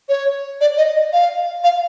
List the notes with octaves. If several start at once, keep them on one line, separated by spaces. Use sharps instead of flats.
C#5
D5
D#5
F5
F5